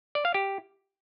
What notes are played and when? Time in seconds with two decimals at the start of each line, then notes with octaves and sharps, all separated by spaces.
0.15 D5
0.25 F5
0.34 G4